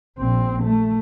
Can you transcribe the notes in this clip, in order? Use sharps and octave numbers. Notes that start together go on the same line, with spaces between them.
A#1 C4
A3